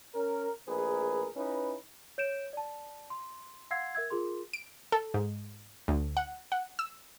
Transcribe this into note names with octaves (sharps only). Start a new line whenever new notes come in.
C#4 A#4
A#1 A2 G#4 A#4 B4
C#4 D#4 E4 B4
C#5 G6 D7 E7
D5 A5
C6
F5 F#5 C6 E6 G#6 C7
A#4 E5 E6 G#6
F4 G#4 A#4 C6
D7
A4
G#2
D2
F#5
F#5
E6